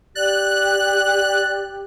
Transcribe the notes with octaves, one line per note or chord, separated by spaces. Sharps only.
G4 D5 F#6